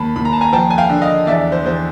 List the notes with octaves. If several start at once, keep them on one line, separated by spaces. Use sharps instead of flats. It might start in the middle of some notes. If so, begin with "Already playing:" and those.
Already playing: D#2 A5 B5
D#2 B5
A#5
A5
G#5 A#5
F3 G5 A5
G#5
F5 G5
D3
D#5 F5
E2 D5 E5
C5
E2 C5